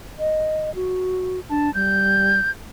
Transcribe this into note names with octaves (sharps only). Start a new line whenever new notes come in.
D#5
F#4
D4 A5
G3 G6